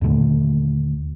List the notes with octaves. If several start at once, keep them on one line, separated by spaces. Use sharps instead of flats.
D#2 A#2 D3 A3